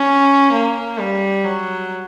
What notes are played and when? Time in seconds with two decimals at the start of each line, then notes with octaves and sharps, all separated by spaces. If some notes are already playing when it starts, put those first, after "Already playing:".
Already playing: C#4
0.53 A#3
0.99 G3
1.45 F#3